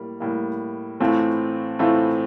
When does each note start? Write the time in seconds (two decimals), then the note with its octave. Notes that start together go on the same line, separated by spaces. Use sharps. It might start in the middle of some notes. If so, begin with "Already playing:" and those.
Already playing: A2 G3 A#3
0.20 A2 G3 A#3
1.00 A2 E3 A3 C4 F4
1.79 A2 E3 A3 C4 F4